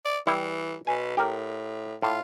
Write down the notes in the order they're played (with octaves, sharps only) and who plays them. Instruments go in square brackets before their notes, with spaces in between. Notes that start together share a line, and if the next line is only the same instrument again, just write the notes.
[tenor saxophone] D5
[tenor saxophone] E3 [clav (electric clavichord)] G3 E4
[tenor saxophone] B2 [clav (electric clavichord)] G#5
[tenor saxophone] A2 [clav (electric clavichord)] G4 A#4
[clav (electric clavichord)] A2 [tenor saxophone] F4